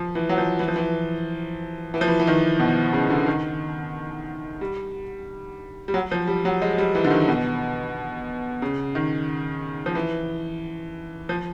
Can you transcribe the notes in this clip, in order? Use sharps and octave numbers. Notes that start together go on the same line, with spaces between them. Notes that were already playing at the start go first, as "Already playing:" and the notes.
Already playing: F3
E3
F#3
F3
E3
F3
E3
E3
F3
E3
E3
D#3
B2
C#3
D3
D#3
G3
G3
F#3
F3
G3
F#3
G#3
G3
E3
D3
D#3
B2
C#3
D#3
F3
E3
F3